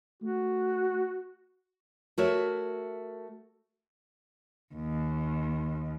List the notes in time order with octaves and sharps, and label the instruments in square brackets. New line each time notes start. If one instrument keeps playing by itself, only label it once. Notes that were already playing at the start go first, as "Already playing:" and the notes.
[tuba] A3 [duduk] F#4
[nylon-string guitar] A3 F#4 A#4 C#5 E5
[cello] D#2